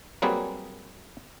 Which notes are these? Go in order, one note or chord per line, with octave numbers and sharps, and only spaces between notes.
F#3 G3 A#3 C4 G#4 B4